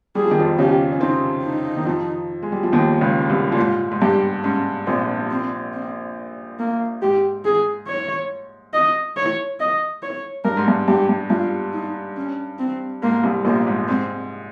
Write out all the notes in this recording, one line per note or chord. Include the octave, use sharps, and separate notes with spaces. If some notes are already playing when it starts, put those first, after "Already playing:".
G3 G#4
F3
D#3
F2 F3
C#3 C#4 G4
C#4
C3 C4 D#4
D#4
D#3
F2 F3
G#3
G3
F3
D#2 D#3
C#2 C#3
C2 C3
A#2
G#2 F4
G#2
G2 G4
G#2 C#4
A#1 A#2 C4
C4
C4
A#3
G#2 G4
G#4
C#5
D#5
C#5
D#5
C#5
G2 A#4
G#2
G2
G2 G4
G2
G2 F4
D#4
C#4
C4
G#2 A#3
C2 C3
A#1 A#2 A#3
G#2
G#2 C4